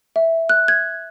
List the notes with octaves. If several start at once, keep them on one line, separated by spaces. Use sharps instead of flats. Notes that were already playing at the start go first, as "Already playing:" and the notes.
E5
F#6
G#6